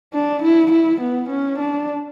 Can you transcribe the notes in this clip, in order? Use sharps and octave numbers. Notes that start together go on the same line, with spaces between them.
D4
E4
E4
B3
C#4
D4